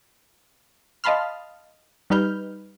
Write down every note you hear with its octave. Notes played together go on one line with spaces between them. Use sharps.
D#5 F5 A5 B5 C6 F6
G3 D#4 B4 F6 G6